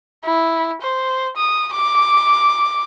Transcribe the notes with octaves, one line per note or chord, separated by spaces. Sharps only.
E4
C5
D#6
D6